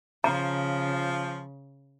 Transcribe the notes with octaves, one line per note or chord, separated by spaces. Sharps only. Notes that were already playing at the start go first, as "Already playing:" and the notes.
C#3 F3 A#5